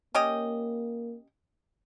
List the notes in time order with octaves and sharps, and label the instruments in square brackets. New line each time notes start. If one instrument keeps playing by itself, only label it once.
[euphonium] A#3 [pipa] C#4 G4 D#5